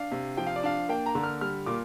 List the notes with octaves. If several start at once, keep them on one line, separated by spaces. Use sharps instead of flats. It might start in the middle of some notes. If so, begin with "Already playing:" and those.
Already playing: D4 F5
C3
F3 G5
F5
D5
D4 F5
A#3 G5
A#5
D3
F6
G3 F6
A#2 D6